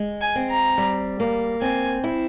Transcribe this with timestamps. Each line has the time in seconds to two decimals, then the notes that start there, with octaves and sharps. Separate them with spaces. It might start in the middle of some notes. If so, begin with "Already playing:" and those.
Already playing: G#3
0.21 G#5
0.35 C4
0.50 A#5
0.78 G3
1.20 A#3
1.61 C4 G#5
2.04 E4